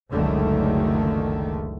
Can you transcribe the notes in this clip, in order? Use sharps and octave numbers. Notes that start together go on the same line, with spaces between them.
F#1 C#2 D3 D#3 A3